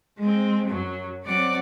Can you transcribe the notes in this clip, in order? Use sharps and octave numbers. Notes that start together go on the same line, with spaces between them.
G#3 C4
F#2 F#3
F#3 C4 D5 F#5 D6